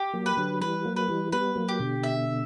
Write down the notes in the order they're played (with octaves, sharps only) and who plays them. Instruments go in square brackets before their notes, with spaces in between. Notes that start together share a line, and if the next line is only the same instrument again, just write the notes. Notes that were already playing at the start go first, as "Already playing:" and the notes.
Already playing: [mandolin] G4
[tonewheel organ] F#3 A#3
[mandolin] B4
[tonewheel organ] D3 F#3
[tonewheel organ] E3 G3 [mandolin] B4
[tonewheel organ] F#3 A#3
[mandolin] B4
[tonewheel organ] E3 G3
[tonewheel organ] G3 B3 [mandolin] B4
[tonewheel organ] F#3 A#3
[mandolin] G4
[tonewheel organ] B2 D3
[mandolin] E5